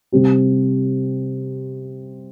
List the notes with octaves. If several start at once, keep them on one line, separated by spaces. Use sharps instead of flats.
C3 G3 C4 G4